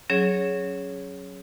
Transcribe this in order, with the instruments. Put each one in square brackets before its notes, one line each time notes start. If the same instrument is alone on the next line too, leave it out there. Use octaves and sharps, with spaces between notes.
[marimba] F#3 C#4 G#4 C#5